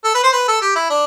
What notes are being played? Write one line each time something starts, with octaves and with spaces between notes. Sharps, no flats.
A4
B4
C5
B4
A4
G4
E4
D4